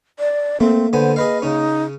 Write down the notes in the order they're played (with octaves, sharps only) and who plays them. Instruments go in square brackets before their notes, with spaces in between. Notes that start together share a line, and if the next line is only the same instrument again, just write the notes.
[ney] D5
[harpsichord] A3 [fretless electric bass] A#3 [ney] C4
[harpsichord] D3 B3 G#5 [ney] C5
[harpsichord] G#4 B4 F5 [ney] D#5
[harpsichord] C#3 C#4 [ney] D#4